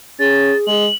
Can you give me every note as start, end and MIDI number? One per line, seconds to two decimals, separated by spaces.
0.20 0.52 61
0.20 0.69 68
0.20 0.57 93
0.67 0.87 56
0.67 0.95 102